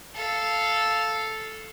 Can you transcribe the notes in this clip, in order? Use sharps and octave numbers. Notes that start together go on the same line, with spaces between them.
A4 F5